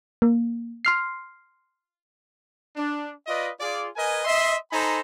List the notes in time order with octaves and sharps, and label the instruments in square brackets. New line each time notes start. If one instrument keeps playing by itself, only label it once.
[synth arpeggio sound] A#3
C6 F6 C7
[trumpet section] D4
F4 B4 D5 D#5
F4 G#4 D5
A#4 B4 D#5 G#5
D#5 E5 C6
D#4 A4 C5 G#5 A#5 B5